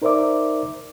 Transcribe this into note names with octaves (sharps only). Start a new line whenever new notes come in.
D#4 A#4 C5 D5 E5 D6